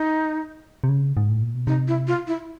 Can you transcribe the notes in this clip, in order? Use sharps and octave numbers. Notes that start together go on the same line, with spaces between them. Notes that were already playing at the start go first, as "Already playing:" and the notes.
Already playing: D#4
C3
C#3
G#2
A2
A#2
B2
C3 D#4
E4
F4
E4